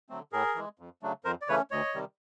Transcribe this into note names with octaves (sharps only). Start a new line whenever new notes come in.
D3 F#3 A3 C4
A2 G#4 A#4
E3 G#3
F2
C#3 F#3 A3 D4
F2 A#4 C5
D5
C#3 E3 A3 C#4 B4 C#5
D2 C#5 D#5
C3 D#3 G3